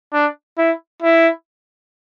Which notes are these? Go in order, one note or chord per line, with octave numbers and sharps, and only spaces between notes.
D4
E4
E4